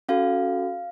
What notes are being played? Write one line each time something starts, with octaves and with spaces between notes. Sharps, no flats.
C#4 F#4 A4 F5